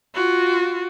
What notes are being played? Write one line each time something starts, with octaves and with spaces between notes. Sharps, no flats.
F4 F#4